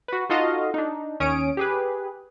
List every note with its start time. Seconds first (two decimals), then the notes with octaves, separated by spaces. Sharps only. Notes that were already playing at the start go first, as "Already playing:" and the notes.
0.08 F#4 B4
0.30 D#4 F4 F#4 A4 D#5 F5
0.74 D4 D#4
1.20 D#2 C#4 C#5 D#6 D7
1.57 G4 G#4 B4